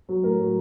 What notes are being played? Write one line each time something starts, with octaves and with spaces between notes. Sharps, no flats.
F#3
A2 A#4
F#3